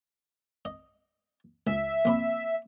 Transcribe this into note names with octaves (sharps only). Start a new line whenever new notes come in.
D#5
C#2 E5
A#1 C3 B5